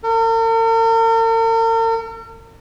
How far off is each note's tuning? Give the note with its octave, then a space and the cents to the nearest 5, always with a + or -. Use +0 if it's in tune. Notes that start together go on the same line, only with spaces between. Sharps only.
A#4 -45